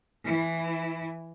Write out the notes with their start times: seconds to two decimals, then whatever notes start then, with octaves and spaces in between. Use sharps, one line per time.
0.25 E3 E4